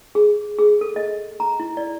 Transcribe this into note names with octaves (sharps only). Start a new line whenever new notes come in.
G#4
G#4
A4
D#5
A#5
E4
D5